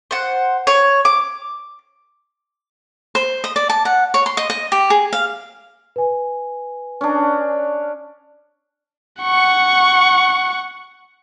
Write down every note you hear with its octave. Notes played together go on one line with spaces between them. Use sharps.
C5 F#5
C#5
D6
C5
D#5
D5
A5
F#5
C#5
C6
D#5
D#5
G4
G#4
F5
B4 G#5
C#4 D4
F#5 C#6